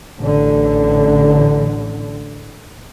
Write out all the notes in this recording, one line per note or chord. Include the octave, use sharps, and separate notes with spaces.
A1 D3